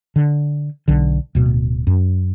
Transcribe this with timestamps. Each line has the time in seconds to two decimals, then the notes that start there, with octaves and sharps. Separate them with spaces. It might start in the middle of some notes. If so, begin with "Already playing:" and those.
0.16 D3
0.88 B1 D3
1.35 D1 B2
1.87 F#2